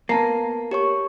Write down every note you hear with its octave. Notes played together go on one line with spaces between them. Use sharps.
A#3 B3 A5 C7
G4 C#5 C#6